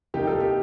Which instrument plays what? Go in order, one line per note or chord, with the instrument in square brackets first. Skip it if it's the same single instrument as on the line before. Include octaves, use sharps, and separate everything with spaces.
[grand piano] C3 F3 A#3 D#4 [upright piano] G4
[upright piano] A4
G4